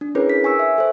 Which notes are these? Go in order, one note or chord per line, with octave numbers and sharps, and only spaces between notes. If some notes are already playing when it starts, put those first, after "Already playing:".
D4
C#4 E4 G#4 A#4 B4 C#5
B6
G#5 C#6 E6
E5
A4 C5